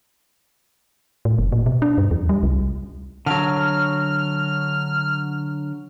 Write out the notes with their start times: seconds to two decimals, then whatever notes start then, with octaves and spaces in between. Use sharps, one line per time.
1.25 A2
1.39 F#1
1.52 A#2
1.66 B2
1.82 D4
1.98 G2
2.11 E2
2.29 G3
2.43 C2
3.26 D3 F#3 F6